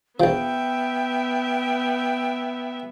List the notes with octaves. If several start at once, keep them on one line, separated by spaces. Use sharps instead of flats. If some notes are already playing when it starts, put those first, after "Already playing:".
A#1 F3 B3 E5 G5